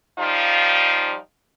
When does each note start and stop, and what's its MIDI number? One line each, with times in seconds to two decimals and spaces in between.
0.18 1.17 53
0.18 1.17 55
0.18 1.17 63
0.18 1.17 65